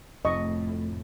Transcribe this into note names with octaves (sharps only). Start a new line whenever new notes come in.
F1 F2 A2 D#5 C#6